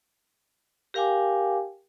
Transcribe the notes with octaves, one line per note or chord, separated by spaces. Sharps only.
G4 A#4 F5 G5 G#5 D6